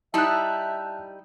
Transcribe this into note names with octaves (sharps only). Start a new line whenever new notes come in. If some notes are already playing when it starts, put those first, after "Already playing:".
G3 D#4 E4 E5 A5 F#6